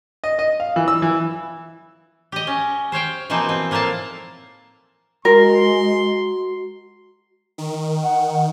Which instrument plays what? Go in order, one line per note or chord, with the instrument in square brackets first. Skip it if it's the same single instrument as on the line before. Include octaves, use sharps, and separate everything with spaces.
[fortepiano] D#5
D#5
F5
E3
E6
E3
[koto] G4 D#5
C#4
C5 C#5 F5 G5
B2 E3 F3 A#3 C4 D#4
C4
A2 A#3 A#4 E5 F5 A5
[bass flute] G#3 [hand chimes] F#4 [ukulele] A#4 [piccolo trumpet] C6
[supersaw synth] D#3
[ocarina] F#5